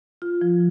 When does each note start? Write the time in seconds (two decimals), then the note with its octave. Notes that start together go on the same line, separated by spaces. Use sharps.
0.22 F4
0.41 F3